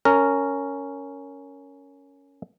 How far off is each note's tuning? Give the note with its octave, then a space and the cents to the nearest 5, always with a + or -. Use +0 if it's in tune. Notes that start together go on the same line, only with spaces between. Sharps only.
C#4 +5 A#4 -15